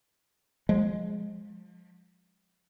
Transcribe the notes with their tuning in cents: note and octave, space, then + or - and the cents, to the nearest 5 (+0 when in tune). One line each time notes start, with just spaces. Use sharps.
F3 +30 G#3 -5